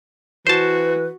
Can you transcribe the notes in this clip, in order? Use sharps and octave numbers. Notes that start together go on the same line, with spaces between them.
E3 F#4 B4 C5 A5